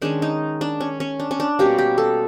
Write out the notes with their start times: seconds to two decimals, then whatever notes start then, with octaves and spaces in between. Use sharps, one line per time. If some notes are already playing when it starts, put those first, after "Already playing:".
0.02 D#3 G#3 C#4 D4
0.22 D#4
0.61 D4
0.81 C#4
1.00 C#4
1.20 D4
1.31 C#4
1.40 D4
1.59 B2 G3 A#3 C#4 G4
1.78 G4
1.98 A4